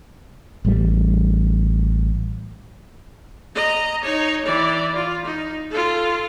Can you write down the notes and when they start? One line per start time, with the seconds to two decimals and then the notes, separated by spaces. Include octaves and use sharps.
0.65 A1 G3
3.55 D#5 A#5
4.04 D#4 C#5
4.45 E3 D5
4.96 F4
5.25 D#4
5.70 F4 A4